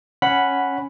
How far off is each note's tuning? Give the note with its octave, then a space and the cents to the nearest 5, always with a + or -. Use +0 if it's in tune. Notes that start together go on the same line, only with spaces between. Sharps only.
C#4 +0 F#5 +0 B5 +0